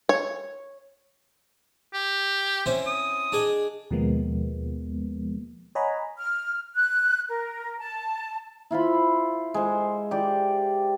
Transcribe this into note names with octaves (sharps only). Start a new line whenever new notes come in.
C#5
G4
C4 C#4 E4
D#6
D4 G#4 D#5
D#2 B2 F3 G#3 A#3 B3
C#5 D#5 F#5 G#5 A#5 B5
F6
F#6
A#4
A5
E4 F4 C5 B5
G#3 C5
G4 D5